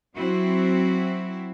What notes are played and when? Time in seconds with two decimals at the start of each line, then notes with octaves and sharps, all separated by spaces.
0.14 F#3 C4 E4 F#4